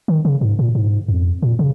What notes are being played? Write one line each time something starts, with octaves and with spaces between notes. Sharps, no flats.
D#3
C#3
G#2
A#2
G#2
F2
A#2
C#3